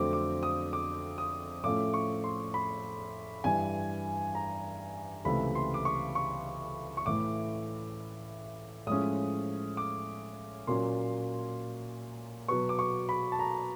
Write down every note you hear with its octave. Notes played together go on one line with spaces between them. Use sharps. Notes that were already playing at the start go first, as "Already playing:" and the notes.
Already playing: F2 D3 F#3 A3 C4 D6
D6
D#6
D6
D#6
A2 F3 A3 C#4 D6
C#6
C6
B5
G2 E3 G3 G#5
A#5
C#2 C3 E3 A3 B5
C6
D6
C#6
C#6
C#6
A2 E3 A3 D6
A2 F3 G#3 C#4 D#6
D6
A#2 F#3 A#3 C#4 C6
B2 F#3 B3 C#6
D6
C#6
B5
A5
A#5